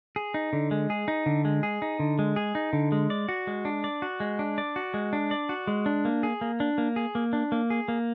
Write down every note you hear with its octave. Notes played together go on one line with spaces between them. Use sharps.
G#4
D#4
D3
G#3
G#4
D#4
D3
G#3
G#4
D#4
D3
G#3
G#4
D#4
D3
G#3
D5
F#4
G#3
D4
D5
F#4
G#3
D4
D5
F#4
G#3
D4
D5
F#4
G#3
D4
A#3
G#4
A#3
D4
A#3
G#4
A#3
D4
A#3
G#4
A#3